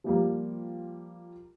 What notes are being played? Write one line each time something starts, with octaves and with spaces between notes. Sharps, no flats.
F3 G3 A#3